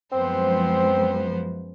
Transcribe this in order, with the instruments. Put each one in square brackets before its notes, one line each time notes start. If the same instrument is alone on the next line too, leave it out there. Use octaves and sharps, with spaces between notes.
[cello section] F#2 F3 G#3 [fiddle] B3 C5 [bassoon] C4